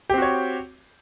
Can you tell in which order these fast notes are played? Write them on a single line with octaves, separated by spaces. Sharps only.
G4 C4 F#4 C#5